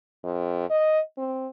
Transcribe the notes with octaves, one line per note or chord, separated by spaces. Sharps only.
F2
D#5
C4